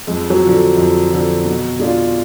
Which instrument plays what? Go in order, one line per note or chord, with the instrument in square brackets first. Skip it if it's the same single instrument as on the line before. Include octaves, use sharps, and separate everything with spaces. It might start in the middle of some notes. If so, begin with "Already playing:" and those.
[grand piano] F2 [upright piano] G#3
[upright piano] F#3
[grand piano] F3
D3
F2
D3 F3
B2
G#3 D4 F4